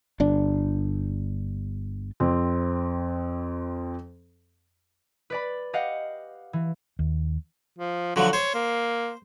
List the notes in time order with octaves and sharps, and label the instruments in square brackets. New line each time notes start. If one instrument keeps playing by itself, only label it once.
[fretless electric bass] G1 D4
[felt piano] F2 C4
[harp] B4 D5 B5
G4 D#5 F5 F#5
E3
[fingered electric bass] D#2
[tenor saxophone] F3
[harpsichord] D3 F3 F#3 [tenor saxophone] F#4
[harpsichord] C5 [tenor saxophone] C#5
[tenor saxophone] A#3